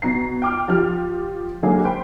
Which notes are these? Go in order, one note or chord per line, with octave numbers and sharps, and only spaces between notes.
B2 A#5 C7
G5 D6 F6
F3 G4 F6
D3 F#3 G#3 A#3 F#4 G#4
C5 G5 B5